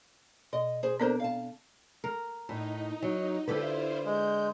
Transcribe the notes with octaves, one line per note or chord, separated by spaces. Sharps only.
B2 D#5
G#4 C5
B3 C4 D4 A4 A#4 C5
F5 A5
A#4
A2 D#4
F#3
D3 E4 F4 G4 A4 B4 C5
G#3 G6